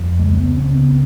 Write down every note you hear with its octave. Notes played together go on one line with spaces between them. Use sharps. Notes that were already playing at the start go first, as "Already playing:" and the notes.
Already playing: F2
C#2 G#3
A#3
B3
C#3 C4
B3